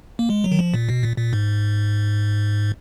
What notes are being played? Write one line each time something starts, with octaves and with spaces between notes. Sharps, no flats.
A#3
G#3
F#3
D#3
F3
A#2
B2
A#2
A#2
G#2